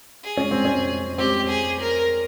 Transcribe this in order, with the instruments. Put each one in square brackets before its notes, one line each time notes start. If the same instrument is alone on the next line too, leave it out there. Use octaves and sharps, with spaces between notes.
[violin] G#4
[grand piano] C#4
C4
C#4
[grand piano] C4 [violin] G4
[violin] G#4
A#4